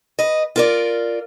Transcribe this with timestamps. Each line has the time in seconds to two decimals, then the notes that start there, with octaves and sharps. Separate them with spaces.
0.19 B4 D#5
0.56 F4 A#4 D5